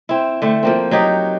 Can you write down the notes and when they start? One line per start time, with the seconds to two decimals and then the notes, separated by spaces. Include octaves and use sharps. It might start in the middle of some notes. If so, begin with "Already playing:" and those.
0.09 C4 E4
0.42 D3 A3 C4
0.63 F3 A#3 C4
0.91 F#3 D#4 G4